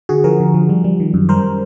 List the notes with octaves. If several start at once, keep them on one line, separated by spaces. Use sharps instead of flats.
D3 F#4 G#4
F3 G#4 A#4
D3
F3
G3
G3
D#3
F#2
G3 A#4 C5